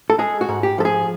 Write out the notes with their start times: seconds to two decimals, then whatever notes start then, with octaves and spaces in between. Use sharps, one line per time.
0.10 A4
0.19 G#3 G#4
0.41 F#4
0.49 G#2
0.63 G4
0.78 F3 A4
0.85 G#4